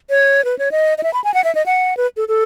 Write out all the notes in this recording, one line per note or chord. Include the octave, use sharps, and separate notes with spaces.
C#5
B4
C#5
D#5
D#5
E5
B5
G#5
F#5
E5
D#5
F#5
B4
A4
A4